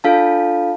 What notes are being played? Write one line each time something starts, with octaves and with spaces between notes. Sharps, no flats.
D4 F4 A4 F5 A5